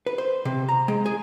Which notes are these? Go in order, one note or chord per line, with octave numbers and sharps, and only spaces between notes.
B4
C5
C3
A#5
G#3
G#4